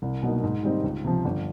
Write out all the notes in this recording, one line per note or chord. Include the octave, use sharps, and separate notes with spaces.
C2
B2 F#3 A#3 D#4
G#2
D#3 G3 C4 D#4
C#2
C3 F3
G1